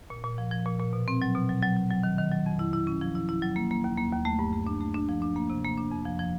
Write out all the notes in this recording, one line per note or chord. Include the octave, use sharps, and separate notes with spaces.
A#2
A#2
F3
F3
A#2
A#2
B2
C4
F#3
B2
F#3
F#3
F#3
F#3
D#3
D#3
F#3
F2
E4
E4
C#4
F3
E4
E4
F#3
A#3
A#3
D#2
A#3
D#2
A3
G2
A3
D4
A3
D4
F3
D4
A#3
C3
A#3
D4
F2
F3
F3